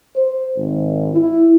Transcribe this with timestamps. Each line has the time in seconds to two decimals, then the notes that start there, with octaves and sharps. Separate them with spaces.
0.16 C5
0.57 G#1
1.14 E4